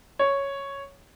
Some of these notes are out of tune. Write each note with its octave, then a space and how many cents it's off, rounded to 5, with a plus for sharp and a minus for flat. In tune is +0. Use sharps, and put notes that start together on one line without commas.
C#5 +0